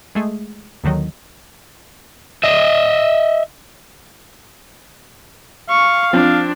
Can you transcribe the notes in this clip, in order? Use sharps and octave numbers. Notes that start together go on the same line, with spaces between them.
G#3 A3 G#4
D#2 D3 D#3 F#3 D#5
D#5 E5
F5 C#6
F3 C4 D4